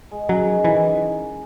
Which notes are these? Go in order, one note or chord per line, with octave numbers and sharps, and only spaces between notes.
G#3
F#3 C#4
D#3
D#3 E3